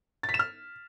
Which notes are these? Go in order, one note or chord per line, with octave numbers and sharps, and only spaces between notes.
A6
B6
E7
F6